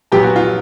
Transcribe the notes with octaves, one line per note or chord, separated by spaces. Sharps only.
A#2 F#3 B3 G4
F#4
F4